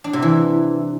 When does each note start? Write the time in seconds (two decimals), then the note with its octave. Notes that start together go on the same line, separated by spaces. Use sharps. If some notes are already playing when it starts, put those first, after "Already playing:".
0.04 D4
0.13 C3
0.22 E3